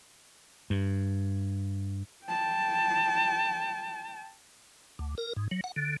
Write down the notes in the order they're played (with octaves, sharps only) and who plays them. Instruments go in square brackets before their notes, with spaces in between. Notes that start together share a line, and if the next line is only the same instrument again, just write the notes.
[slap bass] G2
[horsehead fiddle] G5 A5
[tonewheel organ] D2
A#4
G#2
F#3
F#5
D3